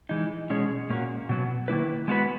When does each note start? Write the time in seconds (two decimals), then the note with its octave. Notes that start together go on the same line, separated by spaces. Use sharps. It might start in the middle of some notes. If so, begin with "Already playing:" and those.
0.09 E3 G#3 D#4
0.50 B2 G#3 C#4 G#4 C#5
0.90 A#2 A#3 C#4 F#4
1.29 B2 F#3 B3
1.68 D#3 A#3 E4 B4
2.08 G#3 B3 F#4 B4